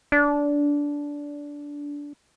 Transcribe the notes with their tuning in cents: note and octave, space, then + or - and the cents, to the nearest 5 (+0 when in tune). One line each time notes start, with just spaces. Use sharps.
D4 -15